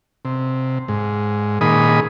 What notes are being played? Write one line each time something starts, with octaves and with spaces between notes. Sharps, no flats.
C3
G#2
A#2 D#3 G#4 B5 D#6